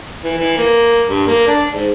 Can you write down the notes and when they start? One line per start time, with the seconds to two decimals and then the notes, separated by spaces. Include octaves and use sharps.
0.24 E3
0.38 E3
0.57 A#3
1.07 G2
1.27 A#3
1.47 D4
1.73 G#2